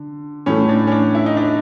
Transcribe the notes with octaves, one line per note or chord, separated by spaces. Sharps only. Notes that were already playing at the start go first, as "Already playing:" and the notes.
Already playing: D3
A2 E3 A3 C#4
D4
C#4
D4
E4
D#4
D4